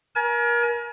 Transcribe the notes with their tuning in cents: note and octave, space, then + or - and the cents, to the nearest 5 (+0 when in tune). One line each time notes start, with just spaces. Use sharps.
A#4 +30 G#5 +35